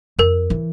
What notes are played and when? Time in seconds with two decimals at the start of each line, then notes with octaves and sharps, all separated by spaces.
0.19 F2 A#4
0.50 E3